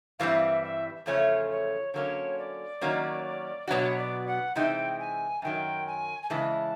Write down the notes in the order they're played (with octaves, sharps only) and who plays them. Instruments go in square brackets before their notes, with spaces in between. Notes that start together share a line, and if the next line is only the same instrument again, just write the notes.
[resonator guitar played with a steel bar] G2 E3 G3 C4 [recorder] F5
[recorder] E5
E5
[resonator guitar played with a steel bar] E2 C#3 F3 A3 C#4 [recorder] C#5
[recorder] C#5
[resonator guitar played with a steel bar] D3 F#3 A#3 C#4 [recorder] C#5
[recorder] D5
[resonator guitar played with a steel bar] D#3 F#3 A#3 C#4
[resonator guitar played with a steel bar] B2 F#3 B3 D4 F#4 [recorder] C#5
[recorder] D5
F#5
[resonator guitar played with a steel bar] C3 E3 G#3 C4 D#4 [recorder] G5
[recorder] G#5
[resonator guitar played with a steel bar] F#2 D#3 F#3 [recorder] G5
[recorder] G#5
G#5
[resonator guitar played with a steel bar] C#3 E3 G#3 [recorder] A5